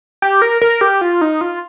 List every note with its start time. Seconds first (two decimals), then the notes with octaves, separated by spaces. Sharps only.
0.22 G4
0.42 A#4
0.62 A#4
0.81 G4
1.01 F4
1.21 D#4
1.41 F4